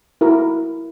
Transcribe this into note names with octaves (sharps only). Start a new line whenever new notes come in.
E4 F#4 A#4